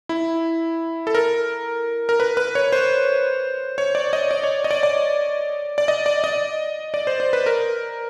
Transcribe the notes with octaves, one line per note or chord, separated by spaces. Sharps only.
E4
A4
A#4
A#4
B4
B4
C#5
C5
C#5
D5
D#5
D5
C#5
D#5
D5
D5
D5
D#5
D5
D#5
D5
C5
C5
B4
A#4